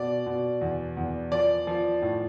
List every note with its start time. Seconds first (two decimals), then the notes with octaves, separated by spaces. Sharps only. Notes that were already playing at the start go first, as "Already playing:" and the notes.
Already playing: B2 D5
0.26 B2
0.61 E2
0.97 E2
1.31 F3 D5
1.67 F3
2.02 A2